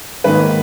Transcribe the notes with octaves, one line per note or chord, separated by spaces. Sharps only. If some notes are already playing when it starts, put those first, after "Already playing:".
G#2 D#3 A#3 B4